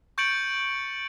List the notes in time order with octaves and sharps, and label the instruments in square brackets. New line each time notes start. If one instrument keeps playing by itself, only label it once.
[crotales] C#6 G6 A6 C#7 D7 F#7